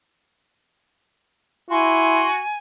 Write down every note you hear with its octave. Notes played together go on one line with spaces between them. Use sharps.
E4 F#4 G#5 C6